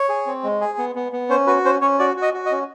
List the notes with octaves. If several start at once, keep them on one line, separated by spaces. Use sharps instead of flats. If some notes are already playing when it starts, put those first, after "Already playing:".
Already playing: C#5
G#4
C4
G#3
G#4
B3
B3
B3
C#4 C5
F#4 B4
C#4 C5
C#4 C#5
F#4 D5
F#4
D#5
F#4
D#5
C#4